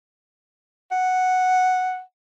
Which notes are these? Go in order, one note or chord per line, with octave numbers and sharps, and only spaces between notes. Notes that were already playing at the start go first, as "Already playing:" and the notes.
F#5